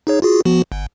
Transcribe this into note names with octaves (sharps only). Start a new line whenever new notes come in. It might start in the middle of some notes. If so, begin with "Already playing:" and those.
D#4 G#4 C#5
F4 F#4 G#4
F3 B3 F#4
G1